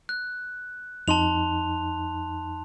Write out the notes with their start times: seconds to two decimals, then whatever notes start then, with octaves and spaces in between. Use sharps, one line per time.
0.09 F#6
1.08 F2 D#4 A5 C6 F7